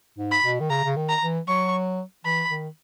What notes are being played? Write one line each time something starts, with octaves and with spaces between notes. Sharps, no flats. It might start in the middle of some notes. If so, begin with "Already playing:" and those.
G#2
B5
B2
D#3
C#3 A#5
C#3
D#3
A#5
E3
F#3 C#6
E3 B5
D#3